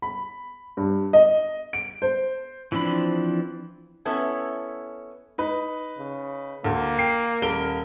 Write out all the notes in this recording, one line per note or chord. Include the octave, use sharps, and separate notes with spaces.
B5
G2
D#5
D7
C5
E3 F3 C4 D4 B5
B3 C#4 E4 A4
D#4 B4
C#3
D2 A#3
G5 C7
D#1 A#4 G7